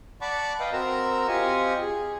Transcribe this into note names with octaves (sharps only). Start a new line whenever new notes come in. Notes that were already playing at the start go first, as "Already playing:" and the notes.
D5 F#5 A5 B5 C#6 D6
B4 D#5 F5 G5
C4 F#4 A#4 A#5 E6
C4 F4 G4 D#5 G#5 C#6
G#4